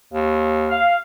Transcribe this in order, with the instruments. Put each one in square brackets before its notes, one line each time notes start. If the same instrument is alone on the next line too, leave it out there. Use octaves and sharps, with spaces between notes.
[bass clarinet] D#2
[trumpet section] F5